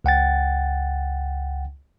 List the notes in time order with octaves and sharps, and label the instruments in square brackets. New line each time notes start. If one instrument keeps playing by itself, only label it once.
[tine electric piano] C#2 F#5 G5 A6